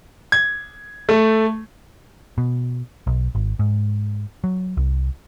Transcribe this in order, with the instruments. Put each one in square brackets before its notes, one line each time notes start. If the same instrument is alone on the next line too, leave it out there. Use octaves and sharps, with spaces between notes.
[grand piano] G#6
A3
[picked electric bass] B2
B1
G#1
G#2
F#3
C2